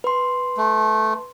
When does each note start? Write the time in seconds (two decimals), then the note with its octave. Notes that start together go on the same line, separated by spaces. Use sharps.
0.04 B4 C6
0.57 A3